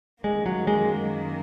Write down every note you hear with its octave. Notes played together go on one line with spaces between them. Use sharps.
F#2 D#3 G#3 A#3
F#3
G#3